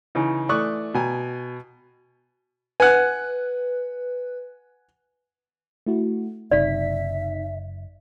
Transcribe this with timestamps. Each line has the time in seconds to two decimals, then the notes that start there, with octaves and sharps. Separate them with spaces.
0.15 C#3 E3 D#4
0.49 E3 A3 D5 C#6 D#6 F#6
0.94 B2 G5 G#5 A#5
2.80 B4 F#5 G#5
5.86 A3 E4 F#4
6.51 F#1 C3 D#4 D5 E5 B6